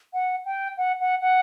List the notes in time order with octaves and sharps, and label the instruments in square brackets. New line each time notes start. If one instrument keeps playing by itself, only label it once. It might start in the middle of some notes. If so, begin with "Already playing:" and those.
[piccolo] F#5
G5
F#5
F#5
F#5